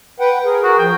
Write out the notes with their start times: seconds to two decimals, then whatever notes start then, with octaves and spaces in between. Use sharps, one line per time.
0.20 B4 F#5 G5
0.45 G#4 A#4
0.64 F#4
0.79 F3 G5